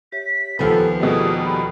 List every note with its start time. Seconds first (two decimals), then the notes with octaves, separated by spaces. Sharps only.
0.12 G4 C#5 E5 B6
0.59 D#2 F3 B3 F4 G4 A4 G#5
1.00 B2 G3 A3 G#4
1.46 A4 B5